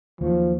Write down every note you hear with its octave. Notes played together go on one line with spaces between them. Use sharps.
D#2 D#3 F3 F#3 A#3